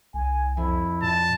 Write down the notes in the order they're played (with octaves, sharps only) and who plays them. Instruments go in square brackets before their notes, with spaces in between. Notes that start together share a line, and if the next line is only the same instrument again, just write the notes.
[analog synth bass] C2 [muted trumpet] G#5
[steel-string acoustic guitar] F2 [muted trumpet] E4
[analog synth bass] A#2 [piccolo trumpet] A5